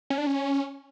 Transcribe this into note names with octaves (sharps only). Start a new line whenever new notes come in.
C#4
D4
C#4